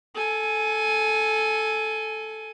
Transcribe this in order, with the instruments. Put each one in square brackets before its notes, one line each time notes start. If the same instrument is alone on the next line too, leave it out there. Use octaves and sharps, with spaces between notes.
[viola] A4 G#5